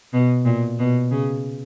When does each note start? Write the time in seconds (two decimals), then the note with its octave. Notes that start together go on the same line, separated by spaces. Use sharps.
0.13 B2
0.45 A#2
0.79 B2
1.11 C#3